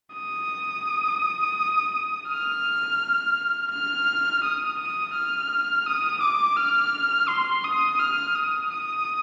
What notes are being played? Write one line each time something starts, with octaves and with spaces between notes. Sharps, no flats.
D#6
F6
F6
D#6
D#6
F6
D#6
D6
F6
C6
D#6
F6
D#6
D#6